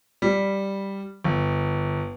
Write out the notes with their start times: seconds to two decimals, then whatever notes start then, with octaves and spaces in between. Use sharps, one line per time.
0.22 G3
1.24 G1